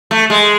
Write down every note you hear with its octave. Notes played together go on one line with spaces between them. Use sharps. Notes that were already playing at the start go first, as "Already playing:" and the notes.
A3
G#3